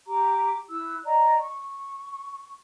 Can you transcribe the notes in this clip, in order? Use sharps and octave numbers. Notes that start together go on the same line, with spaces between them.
G4 A#5 D6
E4 E6 F#6
D5 D#5 A#5
C#6